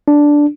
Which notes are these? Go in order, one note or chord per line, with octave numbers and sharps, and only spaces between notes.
D4